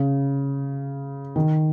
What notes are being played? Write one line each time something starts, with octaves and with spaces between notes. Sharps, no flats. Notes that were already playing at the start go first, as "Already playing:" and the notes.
Already playing: C#3
D#3